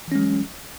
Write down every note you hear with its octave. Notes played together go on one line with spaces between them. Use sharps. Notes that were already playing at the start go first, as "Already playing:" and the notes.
E3 F#3 G#3 C#4